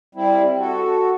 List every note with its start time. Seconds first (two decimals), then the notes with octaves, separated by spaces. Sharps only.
0.15 G3 C4 E4
0.59 F#4 A4